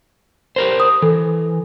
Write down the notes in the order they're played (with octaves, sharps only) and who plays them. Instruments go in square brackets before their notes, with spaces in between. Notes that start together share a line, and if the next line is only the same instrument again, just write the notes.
[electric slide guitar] G4 A#4 C5
[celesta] D#6
[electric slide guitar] E3 [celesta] A4